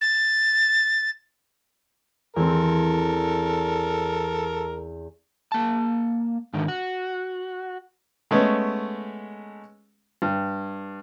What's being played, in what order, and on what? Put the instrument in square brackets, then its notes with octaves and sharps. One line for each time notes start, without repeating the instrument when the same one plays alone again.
[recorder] A6
[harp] E2 C4 [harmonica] A4 A#4
[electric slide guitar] A#3 A5
G#2 D3 D#3
F#4
[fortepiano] G#3 A3 B3 C#4
G2